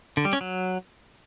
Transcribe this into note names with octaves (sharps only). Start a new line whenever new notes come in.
D3
G3
C#4
F#3